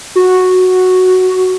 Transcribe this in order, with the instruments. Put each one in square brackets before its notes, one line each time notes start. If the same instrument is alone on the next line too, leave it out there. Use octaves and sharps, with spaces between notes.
[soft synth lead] F#4